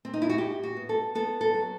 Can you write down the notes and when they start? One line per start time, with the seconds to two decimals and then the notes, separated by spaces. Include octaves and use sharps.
0.05 C4
0.13 D#4
0.22 E4
0.30 F#4
0.38 A2 G4
0.63 F#4
0.76 B3
0.89 A4
1.15 B3 A4
1.41 A4
1.54 F#3